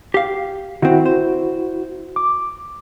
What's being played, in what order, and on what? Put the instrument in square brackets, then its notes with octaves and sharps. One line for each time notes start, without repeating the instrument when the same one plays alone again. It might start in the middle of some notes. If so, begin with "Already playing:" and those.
[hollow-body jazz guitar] G4 F5
[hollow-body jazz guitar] D#3 C4 [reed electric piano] E4 F#4
[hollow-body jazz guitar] C5
[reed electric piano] D6